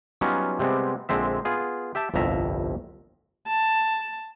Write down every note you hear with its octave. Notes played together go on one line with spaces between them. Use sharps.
F#3 G3 B3 C#4 D#4 F4
C3 G3 G#3 B3 C4
A#1 D3 G#3 C4 E5
B3 F4 G#4
G4 E5 G5 A5
G1 C2 F2 E5 A#5
A5